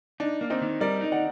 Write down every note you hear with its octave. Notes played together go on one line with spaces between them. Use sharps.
D4 D#4
A#3
C4 D#4
D#3
G3 A#4 D5
D#4
D5 F#5